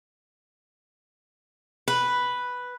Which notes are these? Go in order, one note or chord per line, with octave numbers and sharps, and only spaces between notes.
B4